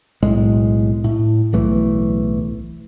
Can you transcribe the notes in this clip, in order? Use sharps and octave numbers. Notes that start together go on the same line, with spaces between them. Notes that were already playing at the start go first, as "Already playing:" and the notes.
B1 A2 G#3
A2
D1 B1 E3 A3